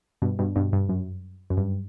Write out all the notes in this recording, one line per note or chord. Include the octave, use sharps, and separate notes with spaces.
G2 B2
G2 B2
G2 B2
G2
F#2
F#2
G2